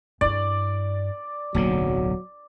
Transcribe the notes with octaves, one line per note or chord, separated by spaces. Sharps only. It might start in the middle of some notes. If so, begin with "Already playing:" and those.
G2 E4 D5
D1 B1 D3 F#3 A#3